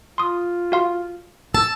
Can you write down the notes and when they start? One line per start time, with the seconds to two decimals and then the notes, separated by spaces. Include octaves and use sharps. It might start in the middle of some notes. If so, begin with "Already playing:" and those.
0.18 F4 C6 D#6
0.72 F#4 F5 C6
1.54 A5 E6